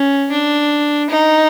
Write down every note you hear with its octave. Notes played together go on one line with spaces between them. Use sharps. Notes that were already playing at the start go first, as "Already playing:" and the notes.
Already playing: C#4
D4
D#4